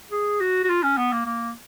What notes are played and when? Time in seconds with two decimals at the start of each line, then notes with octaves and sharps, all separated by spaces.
0.11 G#4
0.40 F#4
0.64 F#4
0.69 F4
0.83 C#4
0.97 B3
1.12 A#3
1.26 A#3